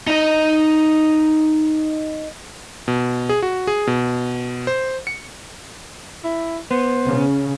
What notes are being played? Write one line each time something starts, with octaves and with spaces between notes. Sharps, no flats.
D#4 D#5
B2
G#4
F#4
G#4
B2
C5
C#7
E4
B3 C5
C#3